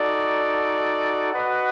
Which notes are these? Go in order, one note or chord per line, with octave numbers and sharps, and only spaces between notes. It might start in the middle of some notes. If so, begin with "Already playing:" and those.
Already playing: D#4 F#4 A4 D5
F#4 B4 D#5 F#5